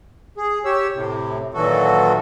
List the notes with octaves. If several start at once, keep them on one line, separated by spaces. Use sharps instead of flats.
G#4
G4 C#5 E6
A2 C3
A#2 D#3 E3 F#3 F#4 A4